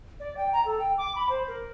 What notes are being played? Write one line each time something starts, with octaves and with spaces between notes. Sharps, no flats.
D5
G5
A#5
A4
G5
D6
B5
C5
A#4